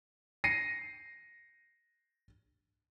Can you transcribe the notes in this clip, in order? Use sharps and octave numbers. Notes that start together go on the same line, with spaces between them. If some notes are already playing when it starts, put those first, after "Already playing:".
A#6 C7 C#7 D#7